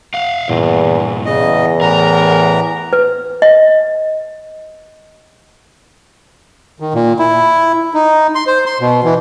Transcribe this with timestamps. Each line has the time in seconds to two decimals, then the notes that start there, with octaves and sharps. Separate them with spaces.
0.14 F5 F#5
0.49 E2 G2 A#2
1.26 E2 C#3 D#5
1.81 A2 E3 A#4 A#5
2.93 B4
3.42 D#5
6.80 D#3
6.94 A#2
7.19 E4
7.94 D#4
8.35 C6
8.47 C5
8.66 C6
8.80 B2
9.04 E3